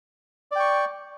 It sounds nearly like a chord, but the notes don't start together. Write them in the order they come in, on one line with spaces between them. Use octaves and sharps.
D5 G5 C#6